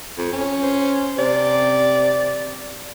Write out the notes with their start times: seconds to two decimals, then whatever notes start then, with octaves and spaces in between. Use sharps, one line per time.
0.18 F2
0.32 C#4
0.63 C5
1.18 C3 D5